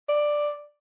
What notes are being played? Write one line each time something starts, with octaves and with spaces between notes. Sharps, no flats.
D5